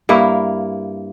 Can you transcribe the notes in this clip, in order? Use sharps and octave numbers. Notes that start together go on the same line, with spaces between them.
G2 A#3 E4 A#4